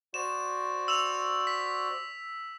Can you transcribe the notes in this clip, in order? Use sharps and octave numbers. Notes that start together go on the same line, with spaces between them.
F#4 C5 D5 E7
E6 E7 F7
B6